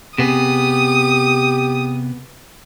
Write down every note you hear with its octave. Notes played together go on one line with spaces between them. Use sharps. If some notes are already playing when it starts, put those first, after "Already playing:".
C3 B3 G4 G#4 D#6